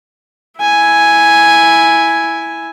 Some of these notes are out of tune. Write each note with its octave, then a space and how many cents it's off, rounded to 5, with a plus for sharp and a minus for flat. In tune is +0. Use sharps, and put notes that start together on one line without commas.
E4 +0 G#5 +0